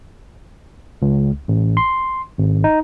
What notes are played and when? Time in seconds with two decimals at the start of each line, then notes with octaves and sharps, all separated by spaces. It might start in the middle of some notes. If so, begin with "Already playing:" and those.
1.02 C#2
1.48 A1
1.77 C6
2.38 G#1
2.64 D#4